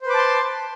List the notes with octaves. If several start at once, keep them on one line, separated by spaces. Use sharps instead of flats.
B4 C5 A5 C6 D6